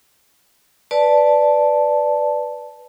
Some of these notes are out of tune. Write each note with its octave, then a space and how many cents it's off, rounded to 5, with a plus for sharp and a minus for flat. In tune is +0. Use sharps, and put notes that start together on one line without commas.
B4 +0 D5 +0 A5 -5